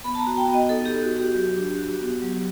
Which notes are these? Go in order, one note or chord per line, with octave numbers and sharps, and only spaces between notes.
B3 B5
A5
A#5
F#4
G5
B3
D#5
D#4 A4
G4
B3
F#4
F#4
G4
F#3
D4
F#4
B3
F#3